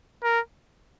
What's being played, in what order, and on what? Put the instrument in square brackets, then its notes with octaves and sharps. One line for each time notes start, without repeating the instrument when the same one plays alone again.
[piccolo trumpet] A#4